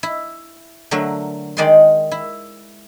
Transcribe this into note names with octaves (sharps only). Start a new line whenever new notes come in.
E4
D3 F#3 A3 A#4
D#3 G#3 D5 D#5 G5 C6
E4